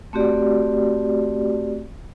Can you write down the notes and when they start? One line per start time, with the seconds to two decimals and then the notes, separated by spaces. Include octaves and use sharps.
0.13 A3 C4 F#4 G4 D5